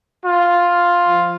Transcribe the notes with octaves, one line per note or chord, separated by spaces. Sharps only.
F4
F3